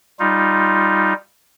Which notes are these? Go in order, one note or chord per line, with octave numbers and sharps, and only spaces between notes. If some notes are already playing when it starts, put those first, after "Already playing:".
G3 D#4 F4